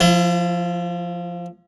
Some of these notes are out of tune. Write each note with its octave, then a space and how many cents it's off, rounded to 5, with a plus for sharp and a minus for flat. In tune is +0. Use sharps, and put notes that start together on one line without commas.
F3 +0 E4 +40